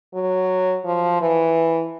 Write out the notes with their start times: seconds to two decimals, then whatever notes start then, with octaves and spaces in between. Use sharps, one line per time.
0.14 F#3
0.85 F3
1.21 E3